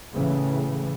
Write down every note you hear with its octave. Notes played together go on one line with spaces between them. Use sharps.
A2 C#3 E3